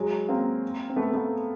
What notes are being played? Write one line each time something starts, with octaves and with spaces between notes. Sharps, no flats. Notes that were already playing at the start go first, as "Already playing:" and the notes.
Already playing: F#3 G#3
A#3 C4
C4
A3 B3
A3 B3